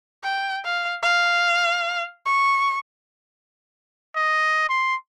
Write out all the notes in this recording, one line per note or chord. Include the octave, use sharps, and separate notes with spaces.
G5
F5
F5
C#6
D#5
C6